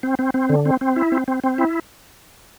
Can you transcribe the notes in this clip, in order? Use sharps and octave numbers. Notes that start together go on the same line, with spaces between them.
C4
C4
C4
D3
C4
C4
E4
C4
C4
C4
E4